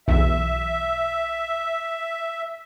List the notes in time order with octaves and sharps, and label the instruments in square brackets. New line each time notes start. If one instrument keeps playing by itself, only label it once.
[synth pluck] B1 E2 [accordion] E5